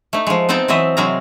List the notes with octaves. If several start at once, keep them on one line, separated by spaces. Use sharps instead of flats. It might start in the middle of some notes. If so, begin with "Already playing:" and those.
A3 D#4
F3 G#3
B3 C4 D#4 G5 A5
E3 F#3 C4 D#5 E5
C3 F#3 G#3 C4 A#4 A#5